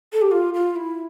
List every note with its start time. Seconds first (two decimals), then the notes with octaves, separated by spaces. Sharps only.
0.13 A4
0.22 G4
0.31 F4
0.54 F4
0.76 E4